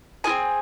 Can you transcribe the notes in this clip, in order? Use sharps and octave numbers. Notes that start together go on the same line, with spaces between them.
C4 F4 G#4 G#5